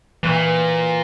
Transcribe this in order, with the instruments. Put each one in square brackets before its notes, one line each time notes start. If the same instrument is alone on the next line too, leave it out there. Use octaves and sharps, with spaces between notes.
[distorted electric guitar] A#2 [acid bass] E3